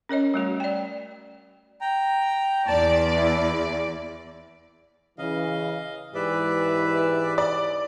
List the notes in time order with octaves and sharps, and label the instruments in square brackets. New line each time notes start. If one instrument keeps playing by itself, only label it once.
[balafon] C#4 A#4 C#5 D#5
G3 A3 F#4
D5 G5
[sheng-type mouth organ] G5 A#5
[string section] E2 D5 [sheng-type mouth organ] A5
[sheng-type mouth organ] E4
[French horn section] C#3 E3 [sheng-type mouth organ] D#5 F5
[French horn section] G#2 E3 G4 [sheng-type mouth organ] B4 D5 E5
[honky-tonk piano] D5